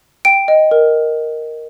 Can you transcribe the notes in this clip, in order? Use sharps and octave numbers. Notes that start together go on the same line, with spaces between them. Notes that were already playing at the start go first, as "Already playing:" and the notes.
G5 D7
D#5
A#4